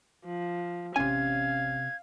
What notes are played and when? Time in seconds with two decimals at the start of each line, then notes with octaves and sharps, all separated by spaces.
0.24 F3
0.96 A1 C3 C#4 F5 G#5 G#6